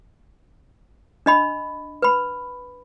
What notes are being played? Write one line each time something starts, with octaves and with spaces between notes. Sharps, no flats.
D4 D#5 B5
B4 B5